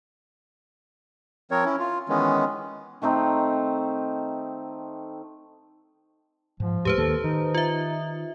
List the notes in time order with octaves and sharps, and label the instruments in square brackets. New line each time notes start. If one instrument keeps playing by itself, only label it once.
[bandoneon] F3 C4 A#4 C#5
C#4 E4
F4
D#3 E3 G#3 B3 C#4
[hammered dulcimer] D#3 A3 C4 D#4
[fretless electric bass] G#2 [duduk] F3
[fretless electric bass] E2 A2 G#3 [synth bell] G4 B4 C5
[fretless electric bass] D#2 D#3 A#3 [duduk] A4
[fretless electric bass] D#3 [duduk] D#4
[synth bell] F4 E5